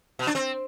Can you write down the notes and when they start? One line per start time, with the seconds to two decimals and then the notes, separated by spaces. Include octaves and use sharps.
0.19 B2
0.27 D4
0.35 C4